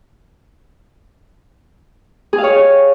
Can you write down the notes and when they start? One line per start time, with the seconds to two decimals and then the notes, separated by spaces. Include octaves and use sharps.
2.33 G#4
2.38 F5
2.44 C#5